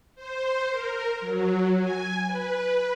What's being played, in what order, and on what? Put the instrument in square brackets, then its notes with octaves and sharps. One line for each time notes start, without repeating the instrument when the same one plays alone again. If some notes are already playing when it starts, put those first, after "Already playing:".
[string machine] C5
A#4
F#3
G#5
B4